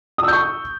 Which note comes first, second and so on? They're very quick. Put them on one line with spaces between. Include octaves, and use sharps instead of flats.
D#6 E6 G6 C#6